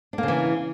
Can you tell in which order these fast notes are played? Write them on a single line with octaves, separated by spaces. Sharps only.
D4 A#3 C#3 E3